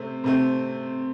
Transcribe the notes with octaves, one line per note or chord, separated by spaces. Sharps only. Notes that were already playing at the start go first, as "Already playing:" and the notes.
Already playing: C3 A3 C4
C3 A3 C4